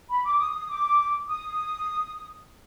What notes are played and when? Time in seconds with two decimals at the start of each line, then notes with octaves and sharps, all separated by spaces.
0.09 B5
0.24 D6
0.38 D#6
0.54 D#6
0.69 D6
1.28 D#6